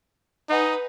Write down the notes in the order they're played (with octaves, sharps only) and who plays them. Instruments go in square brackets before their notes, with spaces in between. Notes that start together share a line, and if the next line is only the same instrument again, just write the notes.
[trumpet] D#4 [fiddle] B4 [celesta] D#5 F#5 G#5